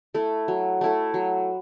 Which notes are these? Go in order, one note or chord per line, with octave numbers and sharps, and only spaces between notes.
A3 E4 A4
F#3
A3 E4 A4
F#3